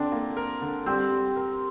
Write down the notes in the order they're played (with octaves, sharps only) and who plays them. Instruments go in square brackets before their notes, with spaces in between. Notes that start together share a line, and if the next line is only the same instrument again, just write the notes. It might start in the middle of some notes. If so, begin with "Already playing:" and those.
Already playing: [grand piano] D3 D4 [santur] C4
[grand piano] A#3
A#4
D3
[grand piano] G3 [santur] C4
[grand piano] G3
A#4